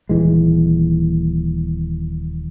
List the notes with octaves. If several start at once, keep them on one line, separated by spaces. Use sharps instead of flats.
D#1 E3 G#3